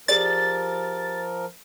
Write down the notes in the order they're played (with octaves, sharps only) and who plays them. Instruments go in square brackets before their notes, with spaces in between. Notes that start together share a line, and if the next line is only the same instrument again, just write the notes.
[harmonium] F3 A#4 [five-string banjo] G4 G#4 D5 [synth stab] A6